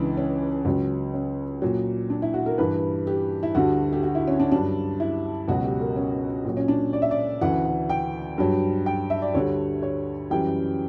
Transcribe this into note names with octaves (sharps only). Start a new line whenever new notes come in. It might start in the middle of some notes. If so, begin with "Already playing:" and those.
Already playing: C#2 C#3 E3 D4
C#4
C#2 C#3 F#3
C#4
A#2 F#3
D4
E4
F#4
A#4
G2 E3 G3 B4
G4
E4
D2 D3 G3 F#4
G4
F#4
E4
C#4
D4
G2 F#3 D4
E4
C#2 B2 F#3 F#4
G4
A#4
C#4
A#2 F#3
C#4
D4
D5
E5
D5
D2 C#3 E3 F#5
F#5
G5
G2 F#3
G5
E5
D5
D2 D3 G3 C#5
C#5
F#2 E3 G3 G5